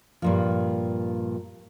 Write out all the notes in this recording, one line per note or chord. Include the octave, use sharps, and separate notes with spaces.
G2 A#2 F3